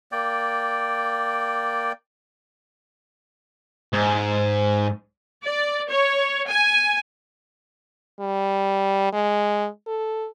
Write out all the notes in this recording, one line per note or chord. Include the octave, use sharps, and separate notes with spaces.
A#3 D5 G5
G#2
D5
C#5
G#5
G3
G#3
A4